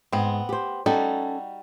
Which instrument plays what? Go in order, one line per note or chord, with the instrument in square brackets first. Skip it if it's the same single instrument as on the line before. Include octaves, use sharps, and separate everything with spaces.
[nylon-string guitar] G#2 [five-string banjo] B3 C4
[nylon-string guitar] G4 C5
[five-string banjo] G3 D#4 F#4 [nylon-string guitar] C#4 A4